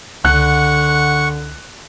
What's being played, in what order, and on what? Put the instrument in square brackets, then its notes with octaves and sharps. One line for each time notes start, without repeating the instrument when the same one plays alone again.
[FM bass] C#2 [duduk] D3 [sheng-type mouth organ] F#5 C#6 [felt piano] F#6